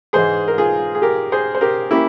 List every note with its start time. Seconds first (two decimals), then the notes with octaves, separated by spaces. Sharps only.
0.13 G#2 E3 G#3 G#4 C5
0.48 A#4
0.58 F4 G#4
0.95 G#4
1.02 G4 A#4
1.32 G#4 C5
1.55 C5
1.61 G4 A#4
1.91 A#3 C#4 E4 G4